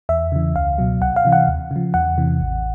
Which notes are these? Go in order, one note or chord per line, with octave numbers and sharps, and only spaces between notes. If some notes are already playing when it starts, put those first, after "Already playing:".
E2 E5
C#3 E3
C#2 F5
B2 F#3
C2 F#5
F5
C3 E3
F#5
D#2
C#3
F3
E2 F#5
C3 E3
A1